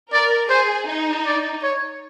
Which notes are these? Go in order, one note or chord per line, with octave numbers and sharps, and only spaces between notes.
A#4 D5
G#4 C5
D#4
D5
C#5